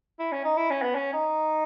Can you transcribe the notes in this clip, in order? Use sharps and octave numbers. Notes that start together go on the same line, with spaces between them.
E4
C#4
D#4
E4
C#4
B3
C#4
D#4